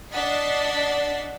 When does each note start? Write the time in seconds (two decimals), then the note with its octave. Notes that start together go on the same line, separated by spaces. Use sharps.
0.14 D4 D#5 F#5 A6 B6 C7